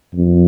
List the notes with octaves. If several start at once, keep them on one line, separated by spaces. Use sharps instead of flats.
F2